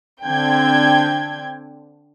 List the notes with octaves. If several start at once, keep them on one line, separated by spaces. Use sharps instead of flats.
D3 C4 D4 G5 G6 G#6